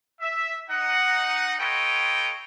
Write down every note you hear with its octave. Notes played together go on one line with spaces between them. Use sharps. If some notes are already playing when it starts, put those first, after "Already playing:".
E5
D#4 F#5
F4 A4 B4 C#5 D#5 G5